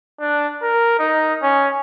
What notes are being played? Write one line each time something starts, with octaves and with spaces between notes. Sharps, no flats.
D4
A#4
D#4
C#4